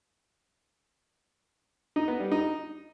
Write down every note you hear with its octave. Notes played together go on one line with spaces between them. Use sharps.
D#4
B3
G3
D#4